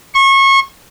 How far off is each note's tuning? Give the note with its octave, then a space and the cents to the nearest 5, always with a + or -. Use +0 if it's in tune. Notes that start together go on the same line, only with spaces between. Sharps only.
C#6 -30